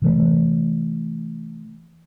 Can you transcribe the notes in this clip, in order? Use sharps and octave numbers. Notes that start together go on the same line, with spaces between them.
C3 E3 A3